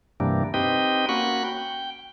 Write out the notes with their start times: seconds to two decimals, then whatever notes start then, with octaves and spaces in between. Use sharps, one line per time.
0.20 G2 C3 E3 G3 A#3 D4
0.54 C4 D#4 G4 B4 D#5 G5
1.09 A#3 C#4 F#4 F#5 B5 C#6
1.44 G5